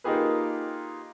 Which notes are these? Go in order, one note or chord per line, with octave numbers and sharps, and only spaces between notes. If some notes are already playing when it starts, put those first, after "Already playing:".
A#3 D#4 F4 G4 G#4 B4